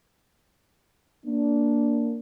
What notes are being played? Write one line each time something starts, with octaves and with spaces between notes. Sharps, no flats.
A#3 D4